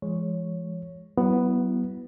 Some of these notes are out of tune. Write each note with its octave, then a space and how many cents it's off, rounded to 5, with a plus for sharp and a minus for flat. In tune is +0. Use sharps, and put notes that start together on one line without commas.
E3 +45 G#3 +0 C#5 +0
F#3 +35 B3 +0 E4 +0